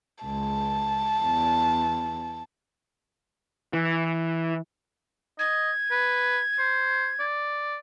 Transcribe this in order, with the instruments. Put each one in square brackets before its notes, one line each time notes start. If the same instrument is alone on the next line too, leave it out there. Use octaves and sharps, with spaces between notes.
[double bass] C#2 [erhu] A5
[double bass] E2
[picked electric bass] E3
[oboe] D#5 [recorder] G#6
[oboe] B4
C5
D5